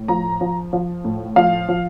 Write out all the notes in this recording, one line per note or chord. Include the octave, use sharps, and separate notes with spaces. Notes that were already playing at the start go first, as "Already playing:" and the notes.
Already playing: A2
F3 A#5
F3
F3
A2
F3 F5
F3